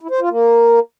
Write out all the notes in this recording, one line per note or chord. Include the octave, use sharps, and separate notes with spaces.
E4
C5
F4
A#3